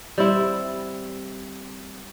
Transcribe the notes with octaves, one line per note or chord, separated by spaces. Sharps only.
G3 C4 E4